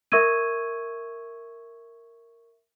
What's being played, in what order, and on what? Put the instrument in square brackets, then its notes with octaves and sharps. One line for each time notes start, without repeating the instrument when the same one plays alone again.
[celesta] A#4 E5 C#6 E6 G#6 D#7